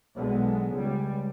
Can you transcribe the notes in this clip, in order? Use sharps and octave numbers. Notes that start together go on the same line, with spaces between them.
B1 D3 G#3 B3
C#2 G3